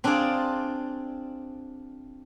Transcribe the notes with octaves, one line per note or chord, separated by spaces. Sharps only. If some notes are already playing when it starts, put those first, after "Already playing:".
C4 D4 F4 G#4 D5